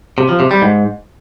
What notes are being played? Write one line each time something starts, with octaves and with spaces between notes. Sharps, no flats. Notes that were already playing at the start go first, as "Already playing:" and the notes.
C3
F3
C3
G3
G#2